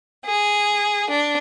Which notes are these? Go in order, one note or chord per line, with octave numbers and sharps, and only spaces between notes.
G#4
D4